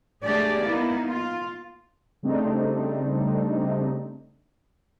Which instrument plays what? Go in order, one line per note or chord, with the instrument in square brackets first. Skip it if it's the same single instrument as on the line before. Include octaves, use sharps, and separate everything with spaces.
[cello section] A3 D4 G4 G#4 D5
A#3 B3 D#4 E4
F4
[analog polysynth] C#3 G3 A3 C4 D4 D#4